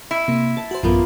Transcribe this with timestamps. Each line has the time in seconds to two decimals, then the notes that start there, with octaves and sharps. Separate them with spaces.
0.11 E4
0.28 C3 A#3
0.57 A5
0.71 F#4 C5
0.83 A1 F#2 A#3 B3 F4